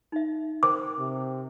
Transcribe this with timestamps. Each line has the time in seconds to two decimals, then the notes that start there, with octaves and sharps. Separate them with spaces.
0.12 D#4 E5
0.63 A#4 C5 G5 D6
0.98 C3